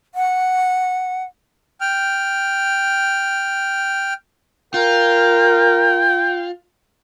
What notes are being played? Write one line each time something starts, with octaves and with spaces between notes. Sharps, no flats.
F#5
G5 F6
F4 A#4 G5